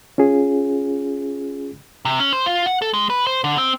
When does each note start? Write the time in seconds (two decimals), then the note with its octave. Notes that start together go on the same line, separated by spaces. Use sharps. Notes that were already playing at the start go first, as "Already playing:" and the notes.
0.18 C#4 F4 G#4
2.05 C3
2.20 C#4
2.33 C5
2.46 F4
2.66 F#5
2.82 A4
2.94 G#3
3.10 B4
3.27 C5
3.44 D3
3.58 C4